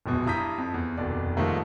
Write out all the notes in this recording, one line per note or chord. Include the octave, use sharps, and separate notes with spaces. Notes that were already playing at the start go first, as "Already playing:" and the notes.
D1 A#1 E2 B2
G2 E4 A#5 D#6 G6 B6
F2
E2
F1 D#2 B2 D5
G#2 D#3 F3 G3 A3 A#3